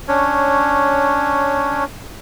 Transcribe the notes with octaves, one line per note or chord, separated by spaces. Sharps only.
C#4 D4 C#5